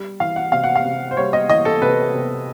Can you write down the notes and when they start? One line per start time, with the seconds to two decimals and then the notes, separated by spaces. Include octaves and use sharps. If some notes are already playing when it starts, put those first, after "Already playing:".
Already playing: G3
0.20 E3 F5
0.36 F#5
0.52 C3 F5
0.64 F#5
0.76 F5
0.85 C3
1.11 C5
1.17 G3 C#5
1.33 D#5
1.49 E3 D#5
1.65 A4
1.82 C3 B4
2.14 C3